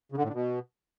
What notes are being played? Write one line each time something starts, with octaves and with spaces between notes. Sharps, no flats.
C#3
D3
A2
D3
B2